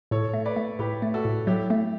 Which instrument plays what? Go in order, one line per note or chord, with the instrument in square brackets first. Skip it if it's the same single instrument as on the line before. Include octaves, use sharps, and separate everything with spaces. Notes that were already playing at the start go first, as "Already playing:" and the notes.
[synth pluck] A2 [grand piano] A4 C#5
[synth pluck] A3
[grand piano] B4 D5
[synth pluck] A3
[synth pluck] A2 [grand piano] G4 B4
[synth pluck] A3
[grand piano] F#4 A4
[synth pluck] A2
[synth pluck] F#3 [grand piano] E4 G4
[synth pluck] A3